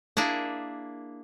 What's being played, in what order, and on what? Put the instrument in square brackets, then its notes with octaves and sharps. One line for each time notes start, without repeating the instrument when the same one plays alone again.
[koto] A#3 D4 E4 G#4